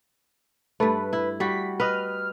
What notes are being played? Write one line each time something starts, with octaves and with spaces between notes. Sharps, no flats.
G2 A3 B4
E4
G3 F#4 B6
B4 D#5 F6